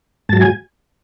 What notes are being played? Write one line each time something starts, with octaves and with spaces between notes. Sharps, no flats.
G#2 F#3 A5
G#5